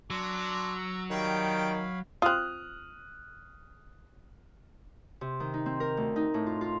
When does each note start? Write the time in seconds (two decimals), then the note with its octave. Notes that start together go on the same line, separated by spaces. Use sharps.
0.10 F#3 D4 A#5 C6 D6 E6
1.11 D#3 G3 C#5 F5 G5 B5
2.22 C4 F4 D#6 F6 F#6
5.21 C3
5.40 D#3
5.54 D#4
5.66 C4
5.80 A#4
5.97 D2
6.16 D#4
6.34 A2
6.46 F4
6.61 F4